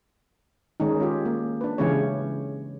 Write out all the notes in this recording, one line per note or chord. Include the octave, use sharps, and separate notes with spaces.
D#3 G#3 C#4 D#4
C#4 F4 G4
A#3
D4 B4
C#3 E3 G#3 C#4 G4 C#5